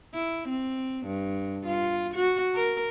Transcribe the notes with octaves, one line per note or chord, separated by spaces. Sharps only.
E4
C4
G2
F4
F#4
A#4